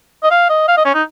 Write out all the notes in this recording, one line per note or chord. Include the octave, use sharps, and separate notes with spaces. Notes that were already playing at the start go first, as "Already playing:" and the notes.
D#5
F5
D#5
F5
D#5
C#4
D#4